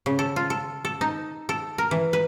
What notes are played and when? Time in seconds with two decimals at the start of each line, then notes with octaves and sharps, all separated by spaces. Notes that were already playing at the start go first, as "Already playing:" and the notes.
0.06 C#3
0.19 A4
0.36 F4
0.50 A4
0.85 A4
1.01 D#4
1.49 A4
1.78 A#4
1.91 E3
2.13 B4